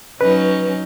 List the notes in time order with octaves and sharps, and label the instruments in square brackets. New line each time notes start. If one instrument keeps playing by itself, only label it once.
[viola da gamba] F#3 C#4 D#4 [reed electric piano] B4